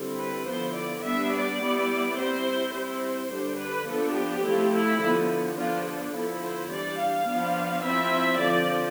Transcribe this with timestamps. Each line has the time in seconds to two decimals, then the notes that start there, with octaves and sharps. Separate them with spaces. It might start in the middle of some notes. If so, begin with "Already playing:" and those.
Already playing: D3 G3 C4 E4
0.19 B4
0.48 D3 F3 B3 E4 C5
0.76 D5
1.05 G3 B3 D4 E5
1.32 D5
1.62 G3 B3 E4
2.18 G3 C4 E4 C5
2.74 G3 C4 E4 C5
3.31 D3 G3 D4
3.59 B4
3.87 F3 B3 D4 A4
4.16 G4
4.44 F3 A3 C4 E4
4.73 E4
5.01 D3 F3 B3
5.58 D3 F3 B3 D4 F4
5.87 A4
6.14 D3 F3 B3 E4 A4
6.44 C5
6.71 E3 G3 D4 D5
6.99 F5
7.28 F3 B3 D4
7.85 F3 C4 E4 E5
8.41 D3 F3 C4 D5